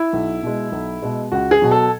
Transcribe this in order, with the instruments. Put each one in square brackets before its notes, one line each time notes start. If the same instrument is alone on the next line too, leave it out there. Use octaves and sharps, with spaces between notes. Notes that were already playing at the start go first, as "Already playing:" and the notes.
Already playing: [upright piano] E4
B1
B2 G#3
B1
B2 G#3
C#2 F#4
G#4
B2 F#3
A4